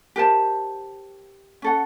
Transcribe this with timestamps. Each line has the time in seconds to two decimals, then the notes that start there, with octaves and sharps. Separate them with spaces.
0.16 G4 A#4 C5 A5
1.62 C#4 A4 F#5